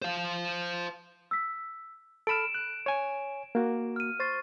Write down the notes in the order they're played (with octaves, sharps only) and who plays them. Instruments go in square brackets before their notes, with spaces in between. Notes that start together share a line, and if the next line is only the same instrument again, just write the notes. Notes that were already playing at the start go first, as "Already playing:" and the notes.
[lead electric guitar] C5 F5
[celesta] E6 B6
[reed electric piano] A4 B5 F6 [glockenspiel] D7 E7
[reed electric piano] F#6
C#5 G#5
A#3 F#4
[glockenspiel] F6 D#7
[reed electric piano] C5 [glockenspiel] C#6 A6 C7